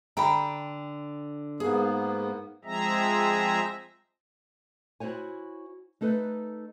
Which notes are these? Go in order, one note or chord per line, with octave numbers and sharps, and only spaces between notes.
D3 G5 A#5 B5
G#2 A#3 B3 G#4
F3 G#3 C4 G#4 E5 A#5
E4 F#4 C5 C#5 G#5
A3 D#4 A4 B4